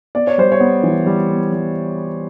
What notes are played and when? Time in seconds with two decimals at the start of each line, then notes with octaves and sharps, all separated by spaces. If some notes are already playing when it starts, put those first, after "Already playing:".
0.15 B3 D5
0.27 C#5
0.38 G3 C5
0.52 C#5
0.60 B3
0.83 E3
1.07 G3
1.30 B3
1.53 G3